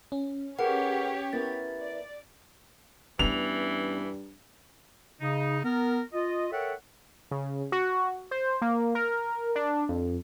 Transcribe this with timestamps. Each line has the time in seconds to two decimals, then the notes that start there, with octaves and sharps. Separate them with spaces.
0.12 C#4
0.59 G4 G#4 A#4 B4 C#5 F#5
1.33 B3 E4 A#4 A6
1.80 D5
3.19 G2 E3 B3 C#4 F7
5.21 C#3 D#4
5.64 B3 A#4
6.13 F4 D#5
6.51 A4 A#4 C#5 E5 F#5 G5
7.31 C#3
7.72 F#4
8.31 C5
8.62 A#3
8.95 A#4
9.55 D4
9.89 F2